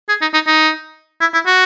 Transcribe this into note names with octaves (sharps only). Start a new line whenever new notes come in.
G#4
D#4
D#4
D#4
E4
E4
F#4